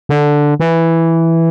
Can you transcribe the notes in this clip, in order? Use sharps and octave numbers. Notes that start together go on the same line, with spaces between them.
D3
E3